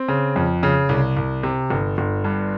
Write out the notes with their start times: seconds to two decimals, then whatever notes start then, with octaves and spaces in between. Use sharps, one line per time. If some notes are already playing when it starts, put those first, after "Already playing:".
Already playing: C4
0.08 C#3
0.36 F2
0.63 C#3
0.89 C2
1.17 C2
1.43 C3
1.70 G1
1.98 G1
2.24 G2